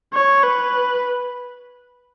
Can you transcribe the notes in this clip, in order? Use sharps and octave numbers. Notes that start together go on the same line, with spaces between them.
C#5
B4